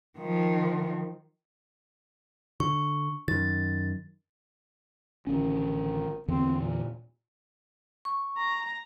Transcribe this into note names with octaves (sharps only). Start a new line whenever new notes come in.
D#3 F3
D3 C#6
F#2 D#3 A6
A1 D3 D#3 C#4
E2 D3 E3 C4
A#2
C#6
A#5